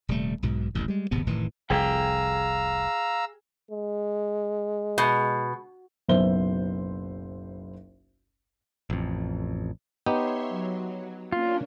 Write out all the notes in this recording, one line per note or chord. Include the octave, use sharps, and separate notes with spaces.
D#1 C3 G3 A3
B1 G#2 B2
D#1 A1 G2
G3 G#3
D1 G#1 C3 B3
F1 A2 D#3 E3
F1 C2 F2 G#4 F5 G5 A#5 E6
G#3
B2
F#1 B1 B3 C5 E5 G7
A1 F2
B3 D#4 G4 C#5 E5 C6
F#3
A#3 C#4 D4 F4